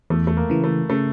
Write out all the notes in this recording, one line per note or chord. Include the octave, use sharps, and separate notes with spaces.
E2 A3
A3
A#3
C#3 E3
A3
C#3 A3